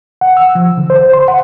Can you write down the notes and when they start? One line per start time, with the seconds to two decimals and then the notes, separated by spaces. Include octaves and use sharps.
0.21 F#5
0.37 E6
0.55 F3
0.78 D3
0.90 C5
1.13 C6
1.28 F#5